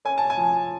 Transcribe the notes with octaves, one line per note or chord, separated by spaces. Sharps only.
C#4 G#5
A5
G#5
F3